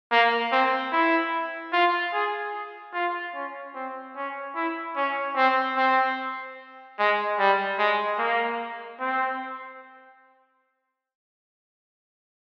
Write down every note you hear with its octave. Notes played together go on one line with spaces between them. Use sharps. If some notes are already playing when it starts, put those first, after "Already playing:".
A#3
C4
E4
F4
G#4
F4
C#4
C4
C#4
E4
C#4
C4
C4
G#3
G3
G#3
A#3
C4